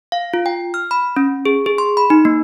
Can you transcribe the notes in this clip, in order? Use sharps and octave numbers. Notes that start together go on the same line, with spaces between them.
F5
F4
G5
F6
B5
C#4
G#4
G#4
C6
B5
D#4
A#3